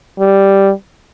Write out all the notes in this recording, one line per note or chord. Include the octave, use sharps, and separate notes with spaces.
G3